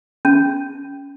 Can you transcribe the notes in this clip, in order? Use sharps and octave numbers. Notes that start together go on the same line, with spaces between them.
C#4